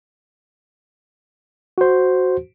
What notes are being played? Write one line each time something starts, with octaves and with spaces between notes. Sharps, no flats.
F#4 C5